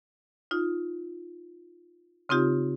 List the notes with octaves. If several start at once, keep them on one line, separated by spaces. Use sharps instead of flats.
D#4 F4
C#3 C4 D#4 F4 G4